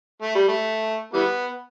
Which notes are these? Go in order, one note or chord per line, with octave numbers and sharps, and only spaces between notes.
A3
G3
A3
E3 G3 B3